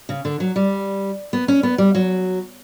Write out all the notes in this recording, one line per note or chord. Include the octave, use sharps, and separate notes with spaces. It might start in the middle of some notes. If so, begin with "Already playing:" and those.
C#3
D3
F#3
G3
B3
C#4
B3
G3
F#3